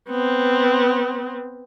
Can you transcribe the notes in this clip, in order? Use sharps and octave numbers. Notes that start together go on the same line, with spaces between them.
B3 C4